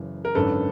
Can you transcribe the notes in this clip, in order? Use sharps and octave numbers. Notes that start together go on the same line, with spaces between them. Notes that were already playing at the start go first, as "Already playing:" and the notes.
Already playing: F#1 F#2 C#3 E3
A#4
G#1 F#2 D3 A4 B4